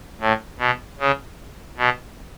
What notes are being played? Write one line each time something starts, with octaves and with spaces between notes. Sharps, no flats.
A2
B2
C#3
B2